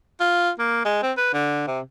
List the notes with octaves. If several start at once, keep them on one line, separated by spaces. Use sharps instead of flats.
F4
A#3
G#3
C4
B4
D3
C3